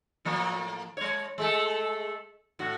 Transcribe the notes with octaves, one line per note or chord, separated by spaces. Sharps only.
A2 F3 A#3
G#3 C#5
G#3 A3 A4
A2 F#4